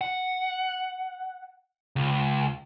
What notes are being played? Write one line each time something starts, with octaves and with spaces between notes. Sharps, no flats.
F#5
C#2